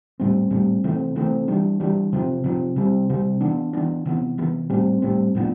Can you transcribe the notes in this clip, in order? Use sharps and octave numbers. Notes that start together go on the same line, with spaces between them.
A2 G3 C4
A2 G3 C4
C3 E3 A3 C4
C3 E3 A3 C4
E3 G3 D4
E3 G3 D4
C3 F3 C4
C3 F3 C4
C3 G3 C4
C3 G3 C4
E3 B3 D4
E3 B3 D4
C3 E3 B3
C3 E3 B3
A2 G3 C4
A2 G3 C4
A2 F3 B3 D4